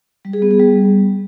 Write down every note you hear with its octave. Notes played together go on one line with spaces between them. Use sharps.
G3
G#4
B3
G#4
G3